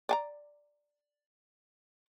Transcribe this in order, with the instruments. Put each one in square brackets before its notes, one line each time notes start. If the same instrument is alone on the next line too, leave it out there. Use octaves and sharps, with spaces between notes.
[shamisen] D5 G#5 A#5